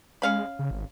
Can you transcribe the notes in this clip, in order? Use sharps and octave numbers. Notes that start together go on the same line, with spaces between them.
G#3 C#4 F5 B5
C#3
G#1